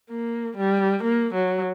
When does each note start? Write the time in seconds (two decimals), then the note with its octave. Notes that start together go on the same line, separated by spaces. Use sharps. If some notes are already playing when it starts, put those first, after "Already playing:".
0.10 A#3
0.57 G3
1.04 A#3
1.34 F#3